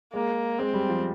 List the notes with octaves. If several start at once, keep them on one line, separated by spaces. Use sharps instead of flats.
G#3 A#3
G#3 C4
G3
F3